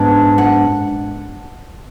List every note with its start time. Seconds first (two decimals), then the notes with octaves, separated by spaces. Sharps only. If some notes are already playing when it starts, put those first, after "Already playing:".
Already playing: G#2 B3 D4
0.38 F#5